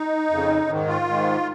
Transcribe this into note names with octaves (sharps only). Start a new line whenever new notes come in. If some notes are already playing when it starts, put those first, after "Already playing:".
Already playing: D#4
F2 C#3
G#2 D#3
F4
G#2 D#3